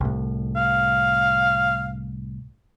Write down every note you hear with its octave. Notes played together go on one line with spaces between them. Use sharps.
C2 A2
F5